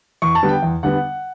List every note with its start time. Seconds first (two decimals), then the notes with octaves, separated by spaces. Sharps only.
0.22 E2 C#6
0.35 A5
0.43 D3 G3 B3
0.49 G5
0.62 E2
0.83 D3 G3 B3 F#5